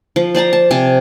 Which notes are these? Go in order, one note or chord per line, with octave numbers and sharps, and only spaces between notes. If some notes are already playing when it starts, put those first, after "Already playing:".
F3
C5 D5 A5 A#5
A5
C3 G#5 A5